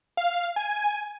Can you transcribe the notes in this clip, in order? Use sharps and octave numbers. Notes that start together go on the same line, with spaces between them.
F5
G#5